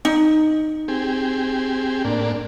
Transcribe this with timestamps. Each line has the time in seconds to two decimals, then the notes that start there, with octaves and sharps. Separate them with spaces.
0.05 D#4
0.88 C4 G4 G#4
2.05 A2 A#3 D4